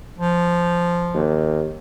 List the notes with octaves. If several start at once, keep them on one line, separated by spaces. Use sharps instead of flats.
F3
D#2